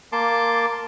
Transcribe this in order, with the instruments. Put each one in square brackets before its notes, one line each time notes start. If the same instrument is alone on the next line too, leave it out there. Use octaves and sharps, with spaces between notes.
[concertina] A#3 A5 C6 D6